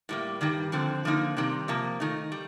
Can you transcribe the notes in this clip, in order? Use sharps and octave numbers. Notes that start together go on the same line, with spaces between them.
A2 G3 A#3
G2 D#3 G3
F2 D3 F3 C4
D3 F3 A#3 D#4
C3 D#3 G3 C4
C3 F3 A#3
D#3 A3 D#4
G3